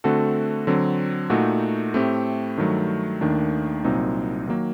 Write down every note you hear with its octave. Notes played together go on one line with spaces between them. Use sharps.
D3 A3 C4 F#4 A4
D3 F#3 C4
A#2 A3 D#4 F#4
A2 A3 C4 G4
G2 D#3 F#3 A3
D#2 D#3 A3 D4
C2 A#2 F#3 C4 D#4
D#3 F#3 A#3